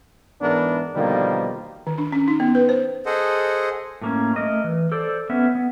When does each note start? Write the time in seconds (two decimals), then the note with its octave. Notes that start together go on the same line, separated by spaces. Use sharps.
0.42 G#2 E3 B3 D4 E4 A#4
0.95 B2 D3 D#3 F3 G3 A#3
1.87 D#3
1.98 D4
2.12 C#4
2.28 D#4
2.40 B3
2.55 B4
2.69 C5
3.06 G#4 A4 C5 D#5 F#5
4.02 A2 A#3 C#4
4.36 A3 A#4 D#5
4.64 E3
4.92 A4 C5 D5
5.30 B3 C#4 E5
5.55 B3